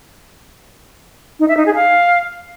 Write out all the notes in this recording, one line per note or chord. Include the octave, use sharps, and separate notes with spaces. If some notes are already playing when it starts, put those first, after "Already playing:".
D#4
E5
D#4
G#4
F5